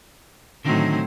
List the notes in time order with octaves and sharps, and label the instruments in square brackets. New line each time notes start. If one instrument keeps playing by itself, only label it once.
[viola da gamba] A2 F#3 C4 [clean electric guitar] D3 D#3 D#4